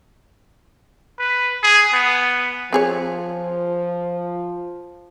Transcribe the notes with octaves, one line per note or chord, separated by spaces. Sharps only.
B4
G#4
B3
F3 C4 G#4 C#5